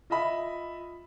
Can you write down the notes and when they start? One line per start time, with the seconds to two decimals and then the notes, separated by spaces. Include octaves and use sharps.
0.10 F4 D#5 E5 B5